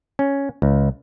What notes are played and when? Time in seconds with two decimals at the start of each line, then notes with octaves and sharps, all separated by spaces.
0.19 C#4
0.62 C#2